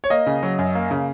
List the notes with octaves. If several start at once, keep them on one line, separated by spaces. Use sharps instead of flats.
C#5
A#3 D#5
C#3
F#3
F#2
A#3
C#3